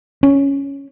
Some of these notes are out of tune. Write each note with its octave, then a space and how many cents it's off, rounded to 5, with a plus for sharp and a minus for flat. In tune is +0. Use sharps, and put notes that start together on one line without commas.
C#4 +5